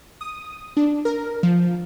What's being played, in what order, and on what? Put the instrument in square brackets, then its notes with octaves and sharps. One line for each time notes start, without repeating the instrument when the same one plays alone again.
[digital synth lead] D#6
D4
A#4
F3